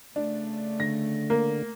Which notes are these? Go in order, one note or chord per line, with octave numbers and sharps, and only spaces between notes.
C#3 A3 D4
D3 A#6
A#3